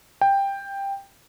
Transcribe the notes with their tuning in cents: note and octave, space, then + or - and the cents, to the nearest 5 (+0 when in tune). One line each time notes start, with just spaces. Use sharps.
G5 +10